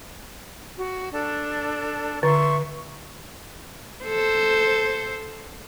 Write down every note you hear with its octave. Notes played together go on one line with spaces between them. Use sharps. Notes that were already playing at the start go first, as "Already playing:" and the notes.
F#4
D4 A4
D3 E5 C6 C#6
A4 C5